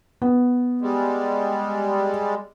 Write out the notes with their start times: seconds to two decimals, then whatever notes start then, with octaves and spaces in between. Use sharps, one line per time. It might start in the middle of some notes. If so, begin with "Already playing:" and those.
0.22 B3
0.81 G3 G#3